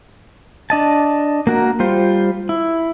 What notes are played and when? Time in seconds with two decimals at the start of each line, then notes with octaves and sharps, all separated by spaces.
0.70 D4 D#5 A5
1.47 A#3 F#4 A#4
1.80 G3 F4 C5
2.49 E4